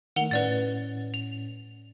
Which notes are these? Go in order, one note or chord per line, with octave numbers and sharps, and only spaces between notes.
D#3 A3 F#5 F7 G7
A2 C#4 B4 D5 A6
F7